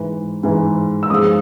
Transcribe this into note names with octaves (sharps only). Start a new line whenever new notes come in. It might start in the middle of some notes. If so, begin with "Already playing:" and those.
Already playing: G#2 E3 G#3
G#2 E3 G#3
E6
G#2 F3 G#3 D#6